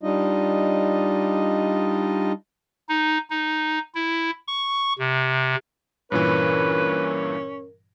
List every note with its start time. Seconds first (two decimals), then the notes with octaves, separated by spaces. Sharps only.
0.03 G3 D4 D#4 F4 D#5
2.89 D#4
3.30 D#4
3.95 E4
4.48 C#6
4.99 C3
6.12 G2 A#2 E3 C#4 A#4 B4